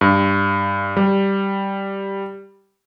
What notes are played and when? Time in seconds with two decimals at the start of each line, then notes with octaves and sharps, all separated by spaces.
0.01 G2
0.97 G3